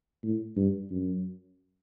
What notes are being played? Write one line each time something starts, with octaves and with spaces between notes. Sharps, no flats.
A2
G2
F#2